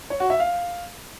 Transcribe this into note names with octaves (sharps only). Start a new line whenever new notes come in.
C#5
F#4
E5
F5